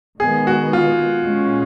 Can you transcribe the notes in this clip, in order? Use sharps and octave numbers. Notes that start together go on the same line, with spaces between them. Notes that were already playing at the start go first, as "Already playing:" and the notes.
D#3 G#3 B3 G#4
F#4
F4
A#2 G#3 C#4